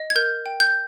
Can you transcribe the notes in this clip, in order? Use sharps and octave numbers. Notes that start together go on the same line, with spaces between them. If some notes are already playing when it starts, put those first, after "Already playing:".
Already playing: D#5
G#6
A#4 G6
G5
G6